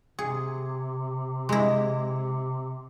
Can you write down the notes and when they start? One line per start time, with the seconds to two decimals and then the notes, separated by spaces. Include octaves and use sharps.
0.19 C3 G#4
1.49 G#3 E4